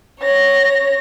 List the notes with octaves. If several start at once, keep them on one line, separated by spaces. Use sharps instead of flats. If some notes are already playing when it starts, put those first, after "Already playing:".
C#5 A#6